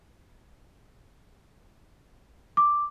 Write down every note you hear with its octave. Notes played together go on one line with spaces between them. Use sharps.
D6